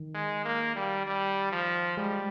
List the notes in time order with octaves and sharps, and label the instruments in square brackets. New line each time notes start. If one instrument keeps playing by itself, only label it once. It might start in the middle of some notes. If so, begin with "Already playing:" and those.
Already playing: [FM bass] D#3
[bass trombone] G#3
A#3
G3
G3
F3
[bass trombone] G3 [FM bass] G#3